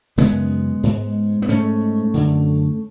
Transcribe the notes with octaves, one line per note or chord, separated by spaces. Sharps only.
F#2 C#3 G#3 B3
G#2
B3
G#2 A3 C#4
F#2 D3